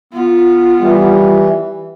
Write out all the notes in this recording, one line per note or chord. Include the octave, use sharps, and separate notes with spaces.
B3 F4
E3 G3